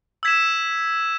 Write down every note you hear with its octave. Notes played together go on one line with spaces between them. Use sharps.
E6 G#6 B6 E7